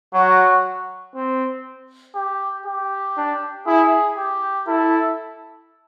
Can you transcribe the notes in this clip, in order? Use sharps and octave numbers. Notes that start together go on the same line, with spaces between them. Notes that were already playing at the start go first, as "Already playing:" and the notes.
F#3 F#4
C4
G4
G4
D4
E4 G#4
G4
E4 A4